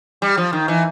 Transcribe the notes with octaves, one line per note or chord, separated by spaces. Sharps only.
G3
F3
D#3
E3